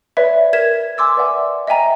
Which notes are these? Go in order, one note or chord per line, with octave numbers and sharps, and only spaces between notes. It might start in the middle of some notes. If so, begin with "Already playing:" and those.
B4 C#5 D5 E5 B5
A#4 G#6 B6 E7
G#5 C6 D6 E6 A6
B4 D5 E5 F#5 G#5
D#5 E5 G5 G#5 A#5